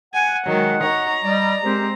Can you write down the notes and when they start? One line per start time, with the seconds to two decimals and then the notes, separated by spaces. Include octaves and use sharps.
0.14 F#5 G#5
0.47 D#3 F#3 G#3
0.82 D#4 C#5 A#5
1.24 G3 D5 D#5
1.63 G#3 C4 G4 A#4 C5